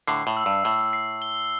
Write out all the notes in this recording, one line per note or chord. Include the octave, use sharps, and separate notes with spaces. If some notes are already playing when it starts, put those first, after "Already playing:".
A2 D3 C7
A2
E6
G2
A2 E6
C7
G7